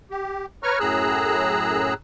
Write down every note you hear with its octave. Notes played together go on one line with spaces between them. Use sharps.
G4
B4 C#5 A#5 C#6 F6
F#2 A2 G#4 A#5 E6 F#6